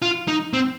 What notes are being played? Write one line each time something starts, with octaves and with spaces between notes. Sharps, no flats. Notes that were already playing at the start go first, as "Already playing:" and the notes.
F4
D#4
C4